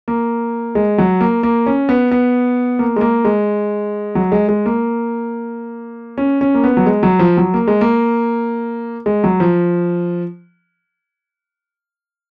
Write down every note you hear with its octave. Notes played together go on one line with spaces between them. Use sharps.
A#3
G#3
F#3
A#3
A#3
C#4
B3
B3
A#3
G#3
A#3
G#3
F#3
G#3
G#3
A#3
C#4
C#4
A#3
B3
F#3
G#3
F#3
F3
F#3
A#3
G#3
A#3
G#3
F#3
F3